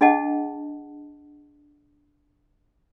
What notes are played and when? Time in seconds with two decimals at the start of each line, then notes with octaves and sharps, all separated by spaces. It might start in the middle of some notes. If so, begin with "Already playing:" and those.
0.01 D4 G#4 D#5 F#5 A5